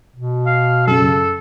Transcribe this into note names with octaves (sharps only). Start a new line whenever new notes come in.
B2
F5
F#2 C#3 A4